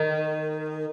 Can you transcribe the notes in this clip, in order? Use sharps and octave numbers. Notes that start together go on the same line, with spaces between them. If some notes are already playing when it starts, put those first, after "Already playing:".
Already playing: D#3